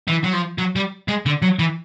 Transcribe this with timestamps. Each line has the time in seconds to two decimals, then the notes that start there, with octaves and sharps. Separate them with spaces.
0.08 E3
0.24 F#3
0.33 F3
0.58 F#3
0.76 G3
1.08 G#3
1.26 D3
1.42 F#3
1.59 E3